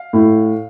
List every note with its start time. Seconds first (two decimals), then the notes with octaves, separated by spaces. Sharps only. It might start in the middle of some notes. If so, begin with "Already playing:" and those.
Already playing: F5
0.13 A2